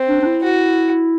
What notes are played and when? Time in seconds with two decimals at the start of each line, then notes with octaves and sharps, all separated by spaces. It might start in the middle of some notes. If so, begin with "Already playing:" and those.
Already playing: C4
0.08 D4
0.22 D4
0.26 E4
0.43 F#4